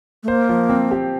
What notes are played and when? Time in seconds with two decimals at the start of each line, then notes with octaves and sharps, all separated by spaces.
0.23 A3
0.28 A#3 C5
0.49 F3
0.70 C4
0.91 G4